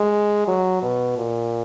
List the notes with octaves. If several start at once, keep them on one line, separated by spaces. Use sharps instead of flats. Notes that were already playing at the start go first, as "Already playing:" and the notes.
Already playing: G#3
F#3
B2
A#2